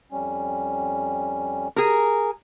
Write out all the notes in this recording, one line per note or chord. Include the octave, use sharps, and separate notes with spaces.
F2 G3 C#4
G#4 A#4